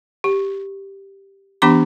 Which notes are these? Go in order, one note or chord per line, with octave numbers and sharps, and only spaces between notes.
G4
E3 B3 D4 G4 B5 D6